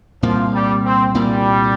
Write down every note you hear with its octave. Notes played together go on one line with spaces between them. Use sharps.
C2 A#2 F3 A#3
G3
C4
C2 A#2 G3 A#3